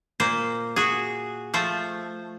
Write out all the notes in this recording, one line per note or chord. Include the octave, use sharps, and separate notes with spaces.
A#2 A#3 C5
F#4 G#4
F3 A3 C5